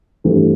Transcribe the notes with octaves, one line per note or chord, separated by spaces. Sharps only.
G2 E3 A3 C4 G4